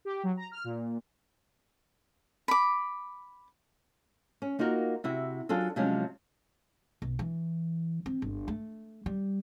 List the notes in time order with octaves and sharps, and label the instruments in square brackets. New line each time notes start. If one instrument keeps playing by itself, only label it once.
[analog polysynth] G4
F#3
A#5
F6
A#2
[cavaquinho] B5 D6
[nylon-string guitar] C#4
A#3 D#4 F4 F#4 A#4
C3 E4 F#4
F#3 D4 F4 G#4 A4
C3 F3 F#3 G#3 C#4 D4
[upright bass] B1
E3
C4
G1
A3
G3